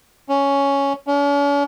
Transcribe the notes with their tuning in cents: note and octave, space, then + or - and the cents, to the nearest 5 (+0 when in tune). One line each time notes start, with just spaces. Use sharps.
C#4 +5
C#4 +45